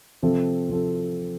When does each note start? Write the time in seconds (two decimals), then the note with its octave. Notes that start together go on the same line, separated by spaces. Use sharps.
0.22 C3 F3 C4 A4
0.69 C3 F3 C4 A4